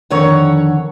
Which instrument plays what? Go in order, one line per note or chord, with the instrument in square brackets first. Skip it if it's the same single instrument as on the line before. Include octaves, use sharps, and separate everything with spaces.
[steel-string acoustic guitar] F2 D3 D#3 C#5 F#5